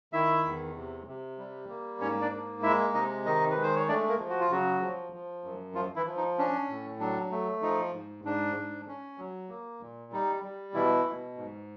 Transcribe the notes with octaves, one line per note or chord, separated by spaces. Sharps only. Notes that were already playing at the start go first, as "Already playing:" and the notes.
D#3 E4 E5
E2
C3
C3
G3
A#3
G#2 C#4 C#5
D4 D5
A#3
G#3 E4 E5
C3 D#4 D#5
D#3 D#4 D#5
B4
G#3
C5
C#5
A3 D4 D5
A#3 A#4
F3
F#4
F4
C#3 F#3 F#4
F3
F3
F#2
F3 F4
E3 E4
F3
D#4
C#4 D4
A2
F#3 D4
A3
F3 D#4
G#2
G#2 D4
G#2
C#4
F#3
A#3
A#2
G3 D#4
G3
B2 E3 E4
B2
G#2